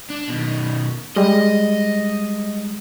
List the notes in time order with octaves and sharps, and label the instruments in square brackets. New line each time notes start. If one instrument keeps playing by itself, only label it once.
[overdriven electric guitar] D4
B2 D#3
[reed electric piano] G3 G#3 [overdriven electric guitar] D#5